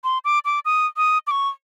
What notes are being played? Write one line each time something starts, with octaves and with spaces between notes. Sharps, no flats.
C6
D6
D6
D#6
D#6
D6
C#6